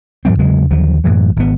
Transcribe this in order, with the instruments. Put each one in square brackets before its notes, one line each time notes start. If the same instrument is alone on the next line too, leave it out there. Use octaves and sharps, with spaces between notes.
[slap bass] G#2 F3 G3 C4
E2 C#3 F#3 G#3
D#2 D3 F3 F#3
F#2 A2 E3 F#3
G#1 B3